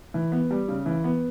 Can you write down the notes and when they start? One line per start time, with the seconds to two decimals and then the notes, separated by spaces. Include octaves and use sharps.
0.14 E3
0.32 B3
0.51 G3
0.68 C#3
0.86 E3
1.04 B3